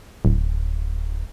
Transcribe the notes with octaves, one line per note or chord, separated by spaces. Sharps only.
D1